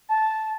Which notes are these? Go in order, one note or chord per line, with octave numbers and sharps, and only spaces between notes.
A5